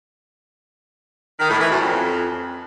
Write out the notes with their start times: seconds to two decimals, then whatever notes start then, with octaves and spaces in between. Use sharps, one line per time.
1.39 D#3
1.49 A2
1.59 E3
1.69 F#2
1.80 F2